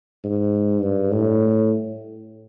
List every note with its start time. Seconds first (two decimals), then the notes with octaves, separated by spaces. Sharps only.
0.24 G#2
0.82 G2
1.11 A2